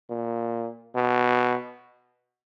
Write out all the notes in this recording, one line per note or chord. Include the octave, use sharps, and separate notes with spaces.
A#2
B2